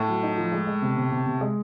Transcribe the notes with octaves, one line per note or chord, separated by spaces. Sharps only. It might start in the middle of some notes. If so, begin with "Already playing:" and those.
Already playing: A2
F#3
D#4
F3
G#3
G#3
C3
C3
C3
C3
G#3